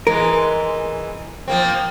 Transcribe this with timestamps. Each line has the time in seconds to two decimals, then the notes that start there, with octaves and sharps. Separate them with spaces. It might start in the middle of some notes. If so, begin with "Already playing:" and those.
0.07 E3 G#3 A#4
1.48 F3 A#3 C4